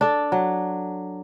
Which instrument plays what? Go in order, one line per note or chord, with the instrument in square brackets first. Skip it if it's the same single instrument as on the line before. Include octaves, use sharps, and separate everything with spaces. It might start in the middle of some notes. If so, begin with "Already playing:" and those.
[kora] D4 A4
F#3